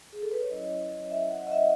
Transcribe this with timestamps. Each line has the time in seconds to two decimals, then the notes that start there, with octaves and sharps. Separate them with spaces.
0.13 G#4
0.22 A4
0.31 B4
0.41 C#5
0.50 F#3 C#4 E4 D#5
1.11 E5
1.31 F#5
1.47 D#5
1.52 E5